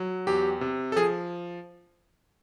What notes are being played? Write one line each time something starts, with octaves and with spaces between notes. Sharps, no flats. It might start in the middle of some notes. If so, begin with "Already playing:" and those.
Already playing: F#3
E2 G4
C3
A4
F3 G#4